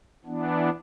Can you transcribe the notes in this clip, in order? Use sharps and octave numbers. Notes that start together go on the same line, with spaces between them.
E3 B3 D4